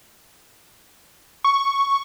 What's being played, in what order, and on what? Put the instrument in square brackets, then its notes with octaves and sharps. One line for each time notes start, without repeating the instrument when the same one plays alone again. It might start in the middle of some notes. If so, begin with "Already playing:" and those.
[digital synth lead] C#6